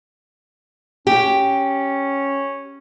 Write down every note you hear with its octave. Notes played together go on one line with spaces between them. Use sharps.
C#4 G4